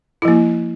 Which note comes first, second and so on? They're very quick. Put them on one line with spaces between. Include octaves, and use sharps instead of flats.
E4 F3 A#3